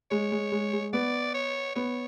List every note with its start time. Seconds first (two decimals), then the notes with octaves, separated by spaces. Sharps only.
0.11 G#3 C#5
0.32 G#3
0.52 G#3
0.73 G#3
0.93 B3 D5
1.34 C#5
1.75 B3 C#5